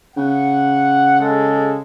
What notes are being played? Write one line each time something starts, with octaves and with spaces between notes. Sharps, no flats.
C#3 F#5
G#3 A4